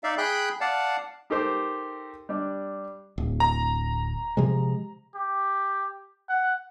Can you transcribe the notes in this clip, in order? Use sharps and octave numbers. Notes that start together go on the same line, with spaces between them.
D#4 D5 E5 F5
G#4 G5 B5 F#6 G6
D5 F5 F#5 A5
D#4 G4 A4 A#4 C5 D6
G3 D4
D1
A#5
C3 F3 G#3
G4
F#5